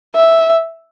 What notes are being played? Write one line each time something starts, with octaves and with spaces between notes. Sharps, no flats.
E5